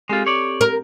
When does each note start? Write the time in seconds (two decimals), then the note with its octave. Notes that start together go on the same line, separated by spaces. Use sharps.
0.09 G#3 C4 F4 G4 A4
0.26 C#5 D5
0.61 A#4